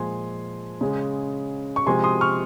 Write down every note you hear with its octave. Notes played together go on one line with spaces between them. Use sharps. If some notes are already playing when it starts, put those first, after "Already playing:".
Already playing: A#2 F3 G#3 G#5 C6
C#3 G#3
C#6
C3 F3 G#3 G#5 C6
C6 D#6
C#6 F6